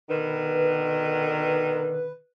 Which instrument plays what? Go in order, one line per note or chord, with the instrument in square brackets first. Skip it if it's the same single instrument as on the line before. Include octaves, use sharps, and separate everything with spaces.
[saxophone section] B2 D3 D#3 [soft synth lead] B4